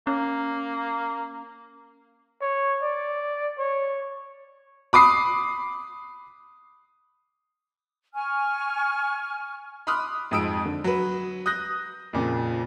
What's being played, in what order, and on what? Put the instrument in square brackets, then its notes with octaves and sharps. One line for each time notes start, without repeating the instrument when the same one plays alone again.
[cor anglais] A#3 [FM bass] C#4
[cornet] C#5
D5
C#5
[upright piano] B5 D6 D#6 C7
[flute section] G#5 C#6 F6
[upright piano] B5 C6 D6 D#6 F6 F#6
F2 G#2 D#6 E6 D7
D3
F#3 B4
D#6 F#6 G6 A#6
F2 A#2 C#3